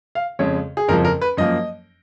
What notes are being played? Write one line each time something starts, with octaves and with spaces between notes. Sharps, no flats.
F5
F2 C#3 G#3 C#5
G#4
F#1 F2 F3 A#4
A#4
B4
F#2 F3 A#3 D#5